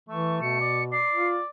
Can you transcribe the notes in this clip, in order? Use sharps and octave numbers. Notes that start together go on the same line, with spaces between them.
E3 A3 C#6
B2 C#7
D5
D5 C7
F4